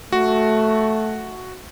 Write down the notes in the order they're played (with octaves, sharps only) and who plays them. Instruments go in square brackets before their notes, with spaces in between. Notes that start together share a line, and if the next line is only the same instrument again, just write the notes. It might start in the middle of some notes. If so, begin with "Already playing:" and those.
[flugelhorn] A3 [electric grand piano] F#4